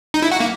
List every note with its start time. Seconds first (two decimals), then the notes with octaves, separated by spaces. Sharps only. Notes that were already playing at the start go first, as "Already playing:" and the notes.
0.14 D#4
0.22 E4
0.32 F#4
0.40 A#3